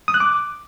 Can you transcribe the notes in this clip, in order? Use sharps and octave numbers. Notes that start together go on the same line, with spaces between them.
D#6
F#6
D6